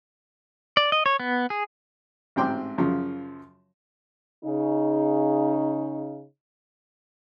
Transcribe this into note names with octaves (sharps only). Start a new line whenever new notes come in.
D5
D#5
C#5
B3
G#4
A1 G#2 C4 G5 C6 D6
F#2 C#3 F3
C#3 D#4